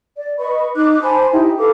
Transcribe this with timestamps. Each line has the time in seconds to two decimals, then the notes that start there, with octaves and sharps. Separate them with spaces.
0.17 D5
0.38 B4 D#5 B5 C#6
0.76 D#4 D6 F#6
1.02 C5 G#5 A5 B5
1.32 D#4 E4 G4
1.58 A4 B4 F5 D6